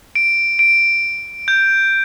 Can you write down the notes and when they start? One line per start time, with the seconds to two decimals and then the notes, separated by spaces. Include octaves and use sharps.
0.15 D7
0.59 D7
1.48 G6